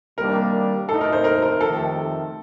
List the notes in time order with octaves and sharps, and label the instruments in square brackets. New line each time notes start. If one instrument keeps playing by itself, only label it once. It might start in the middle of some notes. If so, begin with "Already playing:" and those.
[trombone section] C3 D#3 G3 A#3 D4 [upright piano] A#4
[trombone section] A2 A3 D#4 [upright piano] A4
[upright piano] A#4
C5
A#4
A#4
[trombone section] F2 C3 D#3 A3 [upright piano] A4